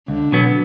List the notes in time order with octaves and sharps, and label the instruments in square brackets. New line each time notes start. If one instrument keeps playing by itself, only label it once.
[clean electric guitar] C#2 [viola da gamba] D3
[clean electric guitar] B2 F#3 B3